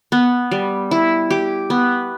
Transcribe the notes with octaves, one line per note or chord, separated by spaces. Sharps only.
B3
G3
E4
G4
B3